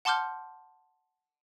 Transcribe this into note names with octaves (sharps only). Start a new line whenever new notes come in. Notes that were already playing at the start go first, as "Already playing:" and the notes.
F#5 A5 C6 D6 F6 G6